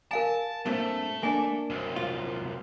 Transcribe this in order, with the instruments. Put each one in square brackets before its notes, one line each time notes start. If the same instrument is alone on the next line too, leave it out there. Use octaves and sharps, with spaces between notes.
[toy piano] A#4 F5 G#5 [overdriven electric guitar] A5
[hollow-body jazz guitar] G2 A#2 C4 [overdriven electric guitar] A3
[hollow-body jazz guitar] A#3 D4 [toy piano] G#5
[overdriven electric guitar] C2 F#2
[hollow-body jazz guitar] F4